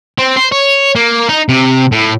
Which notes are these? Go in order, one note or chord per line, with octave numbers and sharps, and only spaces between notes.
C4
C5
C#5
A#3
D#4
C3
A2